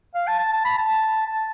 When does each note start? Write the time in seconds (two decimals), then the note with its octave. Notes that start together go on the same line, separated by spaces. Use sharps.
0.15 F5
0.27 A5
0.39 A5
0.52 A5
0.65 B5
0.77 A5
1.27 A5